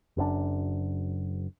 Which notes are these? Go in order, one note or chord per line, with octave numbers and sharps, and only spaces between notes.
F#1 F#2 C#3 D4